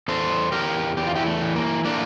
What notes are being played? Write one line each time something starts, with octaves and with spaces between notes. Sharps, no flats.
E2 A4 C5
E2 G4 A#4
E2 G4
F4
E4 G4
A3
E3
A#3
A3 A#3 D4